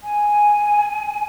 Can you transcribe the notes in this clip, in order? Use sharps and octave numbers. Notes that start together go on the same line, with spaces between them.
G#5